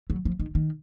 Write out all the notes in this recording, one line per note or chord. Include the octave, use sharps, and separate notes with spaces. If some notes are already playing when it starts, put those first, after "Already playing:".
F#3
F3
D#3
D#3